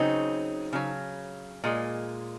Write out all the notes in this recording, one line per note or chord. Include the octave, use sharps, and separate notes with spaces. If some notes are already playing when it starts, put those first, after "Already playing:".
Already playing: C#3 F#3 C4 D#4
C#3 F#3
A#2 G#3